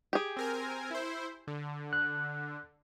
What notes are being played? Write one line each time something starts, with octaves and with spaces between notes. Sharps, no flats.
G4 G#4
C4 A#4 G#5
E4 C5
D3
F#6